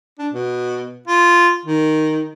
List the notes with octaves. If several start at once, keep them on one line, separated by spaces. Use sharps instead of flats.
D4
B2
F4
D#3